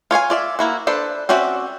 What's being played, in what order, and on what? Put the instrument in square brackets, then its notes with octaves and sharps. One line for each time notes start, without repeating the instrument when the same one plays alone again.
[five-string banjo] F4 C#5 F5 G#5
F4 D5 E5
A#3 E4 F#4
D4 A4 B4 C5
C4 C#4 F#4 D5 E5